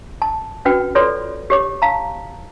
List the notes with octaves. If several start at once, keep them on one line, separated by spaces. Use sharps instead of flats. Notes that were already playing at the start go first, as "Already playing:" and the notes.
A5
C#4 F#4 B4 G5
F4 A4 B4 C#5 D5 C6
G4 C#5 D6
F5 A5 A#5